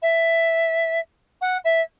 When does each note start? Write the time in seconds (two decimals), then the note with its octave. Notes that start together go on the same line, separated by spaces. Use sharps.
0.02 E5
1.41 F#5
1.64 E5